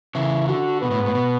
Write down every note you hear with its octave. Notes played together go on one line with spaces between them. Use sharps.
C#3 E3 E4
D3 F#4
B2 B3
A2
G#2
A2
B2